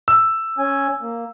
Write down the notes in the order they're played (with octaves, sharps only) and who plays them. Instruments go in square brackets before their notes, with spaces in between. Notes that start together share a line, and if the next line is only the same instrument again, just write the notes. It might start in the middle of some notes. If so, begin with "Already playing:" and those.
[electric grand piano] E6
[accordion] C#4 G#5
A#3